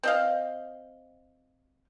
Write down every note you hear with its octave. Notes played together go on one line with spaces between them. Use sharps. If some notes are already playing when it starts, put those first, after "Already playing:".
C4 D#5 F5